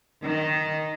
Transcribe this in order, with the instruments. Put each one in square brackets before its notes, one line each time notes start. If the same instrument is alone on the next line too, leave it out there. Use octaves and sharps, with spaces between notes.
[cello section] D#3